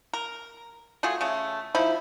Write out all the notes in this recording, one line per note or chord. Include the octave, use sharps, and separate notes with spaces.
A#4
A3 F4 F#4 G#4
C#3 A3
F3 D#4 E4